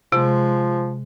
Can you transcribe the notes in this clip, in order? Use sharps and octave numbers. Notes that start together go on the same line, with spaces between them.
C3 F3 G#3